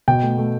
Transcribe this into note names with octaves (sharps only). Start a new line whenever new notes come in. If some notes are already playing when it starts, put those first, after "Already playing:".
B2 G5
A3
A3